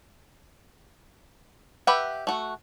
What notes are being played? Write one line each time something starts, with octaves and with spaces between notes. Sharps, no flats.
G4 B4 E5 F#5 G5
A3 F#4